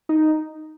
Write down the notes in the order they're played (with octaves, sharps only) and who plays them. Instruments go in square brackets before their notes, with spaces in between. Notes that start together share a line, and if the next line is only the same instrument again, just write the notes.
[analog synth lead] D#4